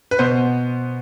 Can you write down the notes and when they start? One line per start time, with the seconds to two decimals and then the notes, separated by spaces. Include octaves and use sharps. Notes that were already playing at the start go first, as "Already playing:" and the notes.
0.11 B4
0.19 B2 B3 C5